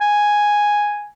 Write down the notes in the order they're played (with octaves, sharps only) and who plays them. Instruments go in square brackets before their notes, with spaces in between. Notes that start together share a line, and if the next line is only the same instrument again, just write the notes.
[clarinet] G#5